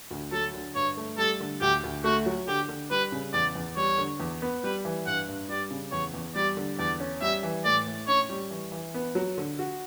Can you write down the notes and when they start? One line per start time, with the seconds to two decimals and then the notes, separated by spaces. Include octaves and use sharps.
0.11 D2
0.32 F#3 A4
0.54 D3
0.75 G2 C#5
0.97 A3
1.18 G3 A4
1.40 D3
1.61 D2 G4
1.83 D2
2.04 A3 F#4
2.26 F#3
2.48 D3 G4
2.68 D3
2.90 G3 B4
3.12 C#3
3.33 E2 D5
3.55 E2
3.77 G3 C#5
3.98 D3
4.20 E2
4.42 B3
4.63 G3 B4
4.85 E3
5.06 G2 F#5
5.28 G2
5.49 G3 D5
5.71 C#3
5.92 E2 C#5
6.14 E2
6.35 G3 D5
6.57 D3
6.78 E2 D5
7.00 C#4
7.22 G3 E5
7.43 E3
7.64 A2 D5
7.86 A2
8.08 C#4 C#5
8.29 G3
8.51 E3
8.72 E3
8.94 B3
9.15 F#3
9.38 D3
9.59 F#4